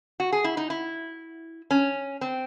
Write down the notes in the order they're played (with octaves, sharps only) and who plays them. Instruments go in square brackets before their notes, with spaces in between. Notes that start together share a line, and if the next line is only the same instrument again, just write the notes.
[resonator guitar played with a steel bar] F#4
G#4
E4
D#4
E4
C#4
C4